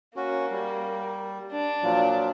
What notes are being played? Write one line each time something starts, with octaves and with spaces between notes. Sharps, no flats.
A#3 C#4 F#4
G3
D4
A#2 F3 F#3